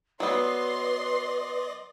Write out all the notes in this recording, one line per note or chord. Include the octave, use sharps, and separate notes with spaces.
F#3 B3 B4 D5 D#5 C6